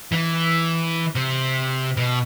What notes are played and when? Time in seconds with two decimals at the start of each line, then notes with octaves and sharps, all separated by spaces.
0.12 E3
1.15 C3
1.97 B2